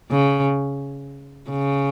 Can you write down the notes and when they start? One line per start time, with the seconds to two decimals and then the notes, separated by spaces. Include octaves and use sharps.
0.11 C#3
1.50 C#3